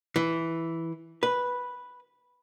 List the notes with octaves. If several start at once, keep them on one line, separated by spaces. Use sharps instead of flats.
E3
B4